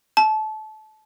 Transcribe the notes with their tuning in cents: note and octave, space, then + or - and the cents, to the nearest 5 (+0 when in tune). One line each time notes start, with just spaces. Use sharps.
A5 -25